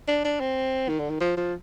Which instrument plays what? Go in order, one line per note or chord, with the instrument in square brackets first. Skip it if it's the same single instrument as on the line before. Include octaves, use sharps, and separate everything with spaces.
[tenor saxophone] D4
D4
C4
D#3
D3
D#3
F3
F3